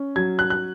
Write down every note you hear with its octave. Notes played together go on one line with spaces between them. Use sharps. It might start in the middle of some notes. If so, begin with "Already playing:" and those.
Already playing: C#4
F#3 G#6
F#6
F#6